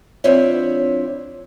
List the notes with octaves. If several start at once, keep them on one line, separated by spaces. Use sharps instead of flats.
F3 C4 D4 E4 C#5 E5